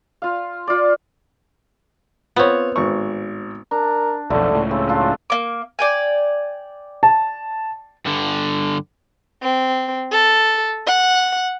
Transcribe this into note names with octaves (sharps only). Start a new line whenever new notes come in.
F4 F5
F4 D5
B3 C4 F4 C#5
G#1 A2 C#6
D4 A#4
B1 F2 D3 A3
C#2 A2
C#3 C4
D4 F4
A#3 D6
D5 G5 G#5
A5
G2 D3
C4
A4
F#5